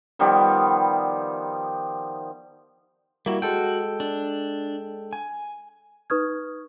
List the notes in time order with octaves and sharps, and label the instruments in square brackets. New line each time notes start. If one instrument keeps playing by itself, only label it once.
[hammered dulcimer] D#3 F3 G3 B3
[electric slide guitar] G3 E4 [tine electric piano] A#3 F#4
[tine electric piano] G#3 A4 G5 [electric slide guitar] F#4
[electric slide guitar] D4
G#5
[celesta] D#4 B4 C#6 D#6 F6 G#6